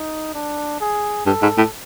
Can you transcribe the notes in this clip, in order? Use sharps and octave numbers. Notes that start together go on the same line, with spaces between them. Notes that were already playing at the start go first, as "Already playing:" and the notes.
Already playing: D#4
D4
G#4
G2 A4
G#2
A2